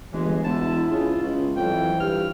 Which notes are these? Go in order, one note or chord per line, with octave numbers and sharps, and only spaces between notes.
G1 E3 G#3
E1 B3 E4 A5
C#3 F4
C#2
F2 E3 F#3 G5
G2 F6